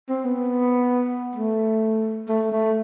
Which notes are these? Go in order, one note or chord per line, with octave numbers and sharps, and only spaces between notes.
C4
B3
A3
A3
A3